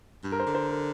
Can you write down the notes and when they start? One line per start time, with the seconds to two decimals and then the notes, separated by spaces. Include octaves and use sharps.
0.24 G2
0.32 A#4
0.40 C5
0.47 D3
0.55 C5
0.70 A#4